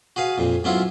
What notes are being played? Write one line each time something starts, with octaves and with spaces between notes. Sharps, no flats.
F#4 G#4 B4 F5
F2 A#2
G#2 F#3 B3 C#4 E4 F4